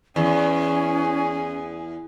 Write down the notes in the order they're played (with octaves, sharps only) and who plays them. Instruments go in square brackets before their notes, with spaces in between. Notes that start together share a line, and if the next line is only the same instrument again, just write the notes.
[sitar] E2 [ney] C#4 [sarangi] G#4